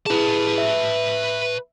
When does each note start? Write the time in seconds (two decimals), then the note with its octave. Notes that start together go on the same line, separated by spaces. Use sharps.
0.06 E4 G#4 B4 A5
0.58 E5